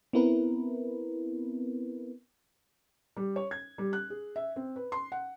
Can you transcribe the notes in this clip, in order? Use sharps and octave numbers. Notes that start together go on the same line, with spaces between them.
B3 C4 E4 A#4 B4
G3
C#5
G#6
G3
F#6
G#4
E5
C4
B4
C6
F#5